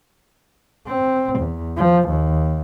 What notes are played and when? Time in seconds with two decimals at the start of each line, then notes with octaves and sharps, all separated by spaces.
0.87 C4
1.39 E2
1.77 F3
2.09 D#2